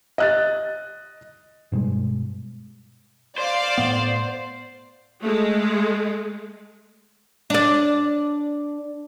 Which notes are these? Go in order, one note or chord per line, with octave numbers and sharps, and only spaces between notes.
D#5 F#6 A6
G2 B2 G3 G#3
C5 D5 F5
A2 B3
G#3 A3
D4 D5